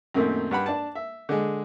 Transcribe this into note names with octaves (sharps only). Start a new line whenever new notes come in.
F#2 A#2 D#3 A3 C4
G2 F#5 B5
D4 A5
E5
D3 G#3